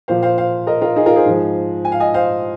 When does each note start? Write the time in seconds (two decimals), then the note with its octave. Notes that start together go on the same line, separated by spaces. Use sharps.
0.08 A#2 F3 C5 F5
0.23 C5 F5
0.38 C5 F5
0.67 A#4 D#5
0.81 F4 A#4
0.96 D#4 G#4
1.06 F4 A#4
1.16 G#4 C5
1.25 G#2 F3
1.85 G#5
1.92 F5
2.00 D#5 G#5
2.14 C5 F5